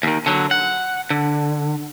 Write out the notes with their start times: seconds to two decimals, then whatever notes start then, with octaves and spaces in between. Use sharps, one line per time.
0.03 D#2 D#3
0.26 D3 F#3
0.51 F#5
1.10 D3